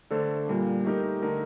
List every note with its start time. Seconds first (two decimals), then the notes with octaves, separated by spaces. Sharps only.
0.10 D3 A3 D4 A4 C5
0.48 A#2 G3 A#3
0.85 A3 D#4 G4 A#4
1.22 D3 A3 D#4 A#4